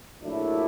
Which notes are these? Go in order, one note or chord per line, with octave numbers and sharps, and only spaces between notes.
A#1 A#2 F#3 A3 D4 E4